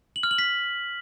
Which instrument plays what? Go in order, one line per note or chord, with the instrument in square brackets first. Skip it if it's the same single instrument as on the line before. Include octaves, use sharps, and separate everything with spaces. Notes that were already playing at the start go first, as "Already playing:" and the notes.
[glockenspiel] F#7
F6
F#7
B6